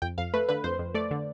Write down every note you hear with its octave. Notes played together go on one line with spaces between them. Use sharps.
F2 G5
F2 F5
A3 B4
D3 B4
F2 C5
F2
A3 D5
D3